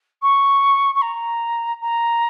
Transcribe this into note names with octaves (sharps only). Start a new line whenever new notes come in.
C#6
C#6
A#5
A#5